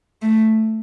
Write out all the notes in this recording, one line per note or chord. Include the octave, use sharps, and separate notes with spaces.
A3